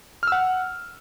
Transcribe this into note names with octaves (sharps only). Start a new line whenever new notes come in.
F#5 E6 F6